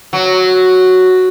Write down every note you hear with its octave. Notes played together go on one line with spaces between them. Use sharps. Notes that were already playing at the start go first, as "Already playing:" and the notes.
F#3